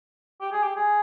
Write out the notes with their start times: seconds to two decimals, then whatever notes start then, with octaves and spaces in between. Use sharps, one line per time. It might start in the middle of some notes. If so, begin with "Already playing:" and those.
0.41 G4
0.52 G#4
0.63 G4
0.76 G#4